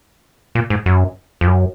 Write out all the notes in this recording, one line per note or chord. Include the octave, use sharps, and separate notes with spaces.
A#2
G#2
F#2
F2
F#2